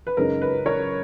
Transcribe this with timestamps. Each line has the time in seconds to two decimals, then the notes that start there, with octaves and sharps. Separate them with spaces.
0.07 B4
0.17 F#2 C#3 G#3 D#4 A#4
0.42 B4
0.66 A#4 C#5